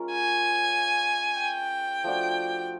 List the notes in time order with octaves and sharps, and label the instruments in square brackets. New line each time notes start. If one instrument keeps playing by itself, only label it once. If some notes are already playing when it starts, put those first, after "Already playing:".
Already playing: [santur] G#3 C#4 F4 A#4
[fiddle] G#5
G5
[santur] F3 A3 D4 F#4